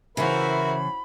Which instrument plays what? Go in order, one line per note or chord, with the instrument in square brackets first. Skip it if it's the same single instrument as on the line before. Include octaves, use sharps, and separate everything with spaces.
[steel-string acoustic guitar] C#3 E3 [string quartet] E4 F#4 C5 [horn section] A#4 E5 [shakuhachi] B5